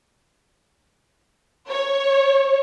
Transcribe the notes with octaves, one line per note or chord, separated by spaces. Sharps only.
C#5